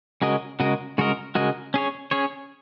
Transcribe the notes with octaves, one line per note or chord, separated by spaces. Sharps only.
C#3 G#3 F#4 A#4 D#5
C#3 G#3 F#4 A#4 D#5
C#3 G#3 F#4 A#4 D#5
C#3 G#3 F#4 A#4 D#5
C#4 G#4 C#5
C#4 G#4 C#5